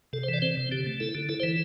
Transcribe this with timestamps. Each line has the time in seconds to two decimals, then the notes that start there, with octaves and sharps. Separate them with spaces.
0.13 C3 A4
0.23 C5
0.28 E3
0.34 D5
0.42 C4 C5
0.57 C3
0.72 D3 G4
0.86 A3
1.00 E4 A4
1.15 D3
1.29 E4 A4
1.40 C5
1.43 E3